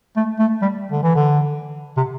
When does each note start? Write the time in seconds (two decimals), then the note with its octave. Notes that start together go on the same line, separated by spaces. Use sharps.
0.17 A3
0.39 A3
0.62 G3
0.92 D3
1.03 E3
1.15 D3
1.97 C3